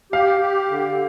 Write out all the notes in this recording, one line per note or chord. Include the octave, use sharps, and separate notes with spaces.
G4 F5
G4
D3